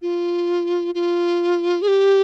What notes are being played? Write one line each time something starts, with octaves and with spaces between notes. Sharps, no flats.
F4
F4
G#4
G4